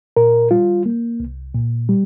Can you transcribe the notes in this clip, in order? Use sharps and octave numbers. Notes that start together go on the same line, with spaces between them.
A#2 A#4
G3 F4
A#3
C2
A#2
G3